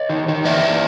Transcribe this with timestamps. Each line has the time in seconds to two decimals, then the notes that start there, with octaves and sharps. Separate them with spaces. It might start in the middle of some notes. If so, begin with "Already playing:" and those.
Already playing: C#5 D#5
0.09 D#3
0.28 D#3
0.45 E3 D5 E5
0.63 E3